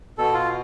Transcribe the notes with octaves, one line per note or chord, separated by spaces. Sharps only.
B2 A4
F4